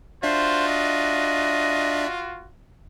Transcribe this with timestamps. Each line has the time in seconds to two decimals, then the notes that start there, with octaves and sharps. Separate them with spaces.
0.23 D4 F4 F#4 C5 D5 E5
0.67 D#5